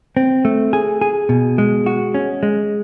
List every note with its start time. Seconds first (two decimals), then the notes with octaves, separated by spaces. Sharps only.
0.17 C4
0.45 A3
0.73 G#4
1.01 G#4
1.29 B2
1.58 G#3
1.86 F#4
2.14 C#4
2.43 G#3